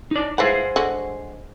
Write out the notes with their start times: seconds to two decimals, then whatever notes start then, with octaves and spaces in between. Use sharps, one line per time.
0.11 D#4 D5
0.38 E3 F3 G#4 B4 C5 F#5
0.76 D3 G#3 F#4